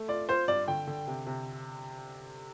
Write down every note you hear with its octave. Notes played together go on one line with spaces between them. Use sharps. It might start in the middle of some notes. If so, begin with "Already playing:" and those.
Already playing: A3
F4 D5
F4 C5
G2 D5
D3 G5
D3
C3
C3